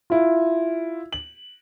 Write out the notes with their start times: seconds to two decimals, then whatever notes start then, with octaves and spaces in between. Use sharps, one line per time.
0.10 E4 F4
1.13 F#7